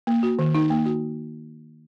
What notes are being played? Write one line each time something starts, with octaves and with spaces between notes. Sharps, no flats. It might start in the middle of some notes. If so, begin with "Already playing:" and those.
A#3
F#4
D#3
D#4
A#3
F#4